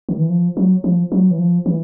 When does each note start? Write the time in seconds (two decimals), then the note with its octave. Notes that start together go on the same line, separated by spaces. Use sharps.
0.09 D#3
0.19 E3
0.29 F3
0.57 F#3
0.84 F3
1.12 F#3
1.31 E3
1.39 F3
1.66 E3